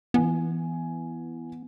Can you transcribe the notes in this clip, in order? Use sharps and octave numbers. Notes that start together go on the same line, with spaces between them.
E3 B3 G#5